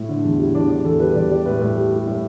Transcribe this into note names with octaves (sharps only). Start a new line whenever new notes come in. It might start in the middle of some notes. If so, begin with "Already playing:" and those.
Already playing: A2 E4
D3
E2
G3 E4
E2 D4
D3 D4
E2 A4
G3 B4
E2 D5
G3 D5
A2 B4
A2
G3
G3
A2